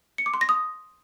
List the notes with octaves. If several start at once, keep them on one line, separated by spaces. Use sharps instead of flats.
C#7
D6
C6
A#6
D#6